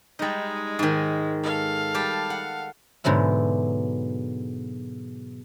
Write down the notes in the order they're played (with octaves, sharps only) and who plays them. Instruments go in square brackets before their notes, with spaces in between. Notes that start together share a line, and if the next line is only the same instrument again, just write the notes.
[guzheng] G3 D#4 [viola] G#3
[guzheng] G#2 D#3
[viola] A4 F5
[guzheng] G3 G4 A5
F#5
G#2 B2 D3 F#3 E4